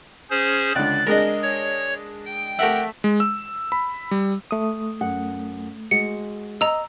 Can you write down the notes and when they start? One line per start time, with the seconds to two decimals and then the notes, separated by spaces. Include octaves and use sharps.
0.30 C#4 G#4 C5
0.75 C#2 D3 D5 F#6 A6
1.07 G#3 D4 G#4 A#4 D#5
1.42 C#5
2.25 G5
2.59 A3 G4 A#4 E5 F#5
3.04 G#3
3.20 E6
3.72 B5
4.11 G3
4.51 A3 D#6
5.01 F#2 F#5
5.91 G#3 F#4 C#7
6.61 D#5 A#5 E6